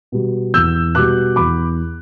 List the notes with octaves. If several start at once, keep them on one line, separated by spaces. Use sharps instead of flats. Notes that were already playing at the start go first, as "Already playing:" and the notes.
B2 G3
E2 E6 G6
B2 G3 D6 F#6
E2 B5 D6